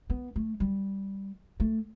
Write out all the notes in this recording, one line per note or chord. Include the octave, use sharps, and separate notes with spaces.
B3
A3
G3
A3